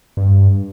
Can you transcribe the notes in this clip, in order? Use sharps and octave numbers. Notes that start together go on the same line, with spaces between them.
G2